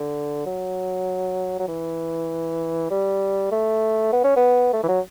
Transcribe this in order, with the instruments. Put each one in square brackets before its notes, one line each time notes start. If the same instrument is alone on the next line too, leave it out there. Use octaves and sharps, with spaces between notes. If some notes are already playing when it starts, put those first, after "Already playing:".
Already playing: [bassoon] D3
F#3
F#3
E3
G3
A3
B3
C#4
B3
A3
E3
F#3